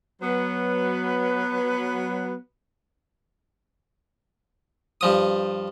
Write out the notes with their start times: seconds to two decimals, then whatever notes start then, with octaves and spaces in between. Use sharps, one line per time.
0.22 F#3 B3 B4
5.01 G2 F3 D#6